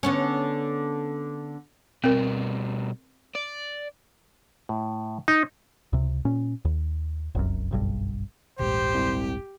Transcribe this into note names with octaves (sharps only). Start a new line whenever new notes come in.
D3 B3 C#4
B2 G3 C4 A#4
D5
A2
D#4
C#2 C3
A#2 C#4
D#2
F1 C2 F#2
F#1 B1 G2
D#1 A#1 G#2 G4 C5
C2